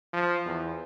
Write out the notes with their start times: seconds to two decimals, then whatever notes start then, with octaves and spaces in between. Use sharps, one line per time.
0.14 F3
0.46 E2